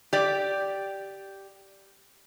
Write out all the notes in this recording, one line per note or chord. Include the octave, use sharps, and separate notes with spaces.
G4 D5